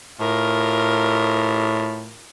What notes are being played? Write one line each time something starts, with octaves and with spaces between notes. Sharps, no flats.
A2 F4 A#4